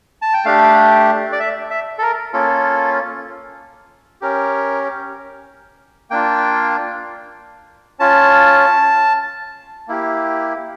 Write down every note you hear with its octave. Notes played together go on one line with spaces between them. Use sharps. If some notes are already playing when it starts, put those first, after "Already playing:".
A5
G5
A3 D4 G4 F5
D5
E5
E5
A4
A#4
A#3 C#4 F4 A4
C#4 G4 A#4
A#3 D4 F4 G5
C#4 F4 A5
A#3 E4 G4